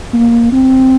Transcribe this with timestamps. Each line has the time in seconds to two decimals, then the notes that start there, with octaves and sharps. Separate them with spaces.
0.13 A#3
0.52 C4